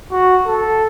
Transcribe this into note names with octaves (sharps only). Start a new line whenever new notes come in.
F#4
A4